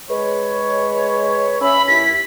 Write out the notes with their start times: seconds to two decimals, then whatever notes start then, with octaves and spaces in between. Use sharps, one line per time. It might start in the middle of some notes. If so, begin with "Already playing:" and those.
0.09 G#3 B4 C#5
1.61 C#4 E5 B5
1.88 D#2 E4 B6